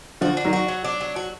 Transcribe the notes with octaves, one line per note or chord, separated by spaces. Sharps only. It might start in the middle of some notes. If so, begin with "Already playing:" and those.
D3 F3 F#4
D4
D#3 F#3
F#4
F#3
D4
F#3
F#4